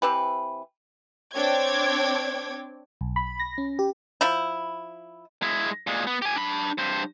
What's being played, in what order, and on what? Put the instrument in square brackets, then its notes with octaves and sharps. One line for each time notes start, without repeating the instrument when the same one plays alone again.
[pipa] E3 C4 G4 B4
[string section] C4 D4 C#5 G5 D6 G#6
[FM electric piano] B1
B5
A#6
C#4
G4
[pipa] F3 E4
[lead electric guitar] G#3 E4
A#2 G#3
B3
G4 G#5
D4 B5
G2 C5